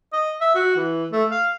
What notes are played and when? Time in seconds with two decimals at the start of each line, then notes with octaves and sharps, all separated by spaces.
0.13 D#5
0.41 E5
0.55 F#4
0.76 E3
1.12 A3
1.31 F5